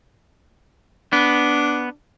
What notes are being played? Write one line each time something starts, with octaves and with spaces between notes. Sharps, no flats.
B3 D4